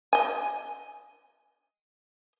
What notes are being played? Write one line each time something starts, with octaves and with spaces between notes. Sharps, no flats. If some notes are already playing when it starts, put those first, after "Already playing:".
D#5 G#5